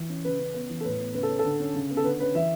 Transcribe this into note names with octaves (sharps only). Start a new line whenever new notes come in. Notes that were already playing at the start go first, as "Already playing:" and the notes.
Already playing: E3
C#4
C#3 B4
C#4
B3
E3
A4
A2 B4
B3
C#3 B4
A4
C#4
A4
D3
C#4
C#3
B3
A4
D3 B4
C#4 B4
E3 E5